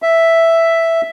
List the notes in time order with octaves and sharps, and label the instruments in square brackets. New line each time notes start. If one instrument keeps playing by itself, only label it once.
[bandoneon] E5